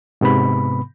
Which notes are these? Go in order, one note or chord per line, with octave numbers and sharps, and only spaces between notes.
G#2 C3 B3 B5